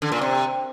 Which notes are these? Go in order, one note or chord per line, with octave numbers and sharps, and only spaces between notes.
D3
A#2
C3